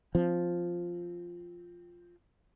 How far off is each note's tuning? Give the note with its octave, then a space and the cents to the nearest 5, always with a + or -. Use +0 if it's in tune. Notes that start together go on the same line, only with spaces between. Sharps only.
F3 +0 C4 +0